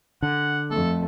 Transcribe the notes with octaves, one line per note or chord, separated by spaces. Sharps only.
D3 F#5
F2 A3 A4